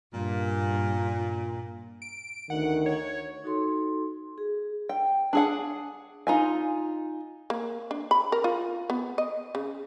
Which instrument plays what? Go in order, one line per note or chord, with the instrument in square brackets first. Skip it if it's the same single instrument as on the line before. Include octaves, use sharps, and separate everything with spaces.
[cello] G2 [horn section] A#2
[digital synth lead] D7
[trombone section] D2 D#3 [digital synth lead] F#5
[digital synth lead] C#5
[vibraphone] D#4 F#4 A4 C6
G#4
[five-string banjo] G5
D4 G#4 F#5
D#4 F4 G#5
[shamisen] A#3
D4
B5
A#4
F4
B3
D#5
C#3